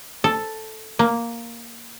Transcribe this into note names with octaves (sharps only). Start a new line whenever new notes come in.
A4
A#3